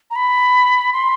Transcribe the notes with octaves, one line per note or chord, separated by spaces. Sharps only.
A#5
B5
C6